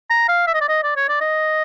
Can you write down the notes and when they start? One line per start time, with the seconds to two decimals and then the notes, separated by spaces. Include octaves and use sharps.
0.10 A#5
0.29 F5
0.47 E5
0.54 D#5
0.61 D5
0.69 D#5
0.84 D5
0.96 C#5
1.09 D5
1.21 D#5